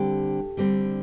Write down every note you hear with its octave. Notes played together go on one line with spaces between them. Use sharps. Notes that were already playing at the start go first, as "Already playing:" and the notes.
Already playing: D3 G3 C4 G4
D3 G3 C4